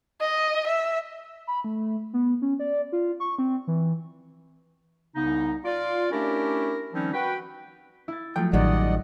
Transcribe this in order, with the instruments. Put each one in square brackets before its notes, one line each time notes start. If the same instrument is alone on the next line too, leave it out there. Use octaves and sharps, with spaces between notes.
[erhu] D#5
E5
[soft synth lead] B5
A3
B3
C#4
D5
F4
C#6
C4
E3
[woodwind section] C2 C#3 B3 D#4
F4 D5
A3 C#4 D4 E4 G4 A#4
D#3 F3 G3 C4 C#4 D#4
F#4 B4 G5
[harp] E4 A6
[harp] F3 F#3 A3 [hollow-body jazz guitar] G5
[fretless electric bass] A1 [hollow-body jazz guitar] F#2 D#3 G3 [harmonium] D5 D#5 F#5